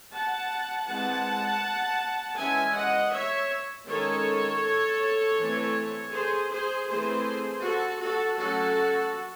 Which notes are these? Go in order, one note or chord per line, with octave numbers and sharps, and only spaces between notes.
F#5 A5
E3 G#3 C4 F#5 A5
E3 G#3 C#4 E5 G#5
D#5 F#5
C#5 E5
D#3 G#3 C#4 A4 C#5
E3 A3 C4
G#4 C5
G#4 C5
E3 A3 C4 G#4 C5
F#4 A4
F#4 A4
F#3 A3 C#4 F#4 A4